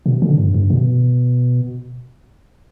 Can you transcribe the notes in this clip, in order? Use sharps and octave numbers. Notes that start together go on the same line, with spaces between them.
B2
D3
G2
G2
B2